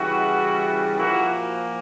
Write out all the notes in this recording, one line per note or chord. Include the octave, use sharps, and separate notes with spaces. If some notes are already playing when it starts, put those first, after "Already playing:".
Already playing: C#3 E3 G3 E4 F#4
A#2 F3 A#3 E4 F#4